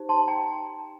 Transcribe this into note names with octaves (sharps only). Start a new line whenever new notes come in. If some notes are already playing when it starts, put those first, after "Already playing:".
Already playing: D#4 G4 C5
A5 C6
G5 A#5